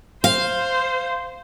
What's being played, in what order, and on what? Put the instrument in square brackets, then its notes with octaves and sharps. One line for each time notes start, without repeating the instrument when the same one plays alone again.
[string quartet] C5 [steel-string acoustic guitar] F5